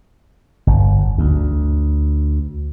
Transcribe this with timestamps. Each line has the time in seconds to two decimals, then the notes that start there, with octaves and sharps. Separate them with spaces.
0.67 G1
1.18 D2